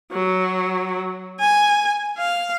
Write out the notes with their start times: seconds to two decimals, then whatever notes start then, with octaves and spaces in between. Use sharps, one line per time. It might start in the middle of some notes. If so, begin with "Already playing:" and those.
0.12 F#3
1.40 G#5
2.18 F5